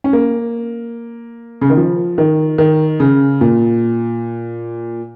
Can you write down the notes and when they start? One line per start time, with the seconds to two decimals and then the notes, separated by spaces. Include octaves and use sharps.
0.04 C#4
0.13 A#3
1.61 C#3
1.70 D#3
1.77 F3
2.18 D#3
2.58 D#3
3.00 C#3
3.41 A#2